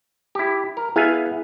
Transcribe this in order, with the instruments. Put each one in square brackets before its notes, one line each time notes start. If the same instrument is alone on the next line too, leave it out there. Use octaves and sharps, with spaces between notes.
[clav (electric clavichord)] E4 G4
A#4
[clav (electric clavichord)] B3 F5 G#5 [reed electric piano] E4 G#4 E5